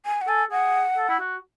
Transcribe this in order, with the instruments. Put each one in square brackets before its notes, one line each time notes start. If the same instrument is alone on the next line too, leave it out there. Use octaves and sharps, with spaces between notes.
[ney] G#5
F#5
[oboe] A4 [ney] G#5
[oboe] G#4 [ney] F#5
[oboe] A4
E4
F#4